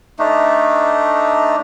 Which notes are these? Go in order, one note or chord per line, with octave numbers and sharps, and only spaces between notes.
A3 D4 D#4